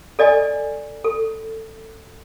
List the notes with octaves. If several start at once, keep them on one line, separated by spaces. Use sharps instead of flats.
A4 D5 D#5 G#5
A4